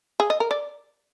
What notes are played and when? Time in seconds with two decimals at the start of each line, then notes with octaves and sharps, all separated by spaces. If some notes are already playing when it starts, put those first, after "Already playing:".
0.20 G#4
0.30 D#5
0.40 A#4
0.51 D5